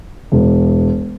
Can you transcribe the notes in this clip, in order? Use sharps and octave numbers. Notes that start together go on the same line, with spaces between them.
E1